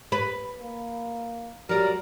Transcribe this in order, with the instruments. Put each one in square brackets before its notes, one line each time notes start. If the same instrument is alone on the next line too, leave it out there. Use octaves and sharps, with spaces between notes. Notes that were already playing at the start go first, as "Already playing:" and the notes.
[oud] B4
[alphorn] A#3
[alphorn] F#3 [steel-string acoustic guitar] G3 D5 [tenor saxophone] A#4